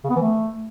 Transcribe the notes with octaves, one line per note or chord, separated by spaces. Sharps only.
C#3
B3
E3
A3